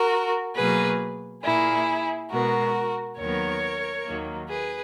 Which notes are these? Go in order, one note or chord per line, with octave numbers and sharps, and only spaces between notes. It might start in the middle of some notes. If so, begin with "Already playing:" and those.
Already playing: F#4 A#4
B2 F#3 A#3 G#4 B4
A#2 A#3 E4 G#4
B2 G#3 B3 F#4 A#4
D#2 D#3 F#3 B3 A#4 C#5
D#2 D#3 F#3 A#3
G#4 B4